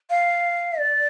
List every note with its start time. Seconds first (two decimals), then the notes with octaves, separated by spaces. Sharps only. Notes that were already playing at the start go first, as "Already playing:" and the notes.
0.10 F5
0.79 D5